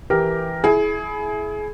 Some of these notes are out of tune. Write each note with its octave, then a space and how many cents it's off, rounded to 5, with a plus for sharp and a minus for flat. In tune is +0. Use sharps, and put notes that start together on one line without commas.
E3 +0 G4 +0 A#4 +0
E4 +0 G#4 +25